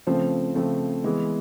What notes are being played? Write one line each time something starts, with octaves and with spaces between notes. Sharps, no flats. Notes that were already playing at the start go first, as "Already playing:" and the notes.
C#3 F3 A3 C4
C#3 F3 A3 C4
E3 G#3 B3